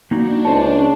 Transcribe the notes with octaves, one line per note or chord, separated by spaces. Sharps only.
A#3 D4 D#4 F#4
C#2 C5 C#5 A5